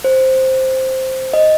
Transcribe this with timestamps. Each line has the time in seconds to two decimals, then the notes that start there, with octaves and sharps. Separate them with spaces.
0.04 C5
1.33 D#5